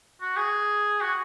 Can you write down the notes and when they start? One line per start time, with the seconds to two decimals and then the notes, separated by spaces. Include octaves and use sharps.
0.21 F#4
0.37 G#4
1.01 F#4